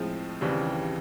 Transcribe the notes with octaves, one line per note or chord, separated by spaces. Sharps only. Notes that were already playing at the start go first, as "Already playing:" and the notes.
Already playing: A2 F3 G#3 C4
D#2 C#3 E3 G3 C4